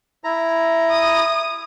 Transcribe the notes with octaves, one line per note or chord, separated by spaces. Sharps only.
E4 A#5
D#6